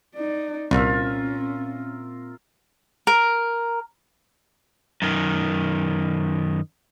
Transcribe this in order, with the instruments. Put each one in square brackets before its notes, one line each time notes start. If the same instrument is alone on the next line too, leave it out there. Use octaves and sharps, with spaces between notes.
[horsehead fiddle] D#4 D5
[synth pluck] C2 [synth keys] A#2 C4 [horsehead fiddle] C#4 [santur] F4 A#4 E5
[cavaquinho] A#4
[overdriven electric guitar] F#2 D#3